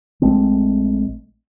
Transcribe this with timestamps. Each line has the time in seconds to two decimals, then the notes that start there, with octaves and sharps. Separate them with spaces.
0.22 A#1 G#3 A3 C4